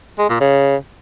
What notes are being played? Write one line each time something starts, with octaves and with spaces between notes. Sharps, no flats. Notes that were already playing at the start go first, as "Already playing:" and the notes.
G#3
A#2
C#3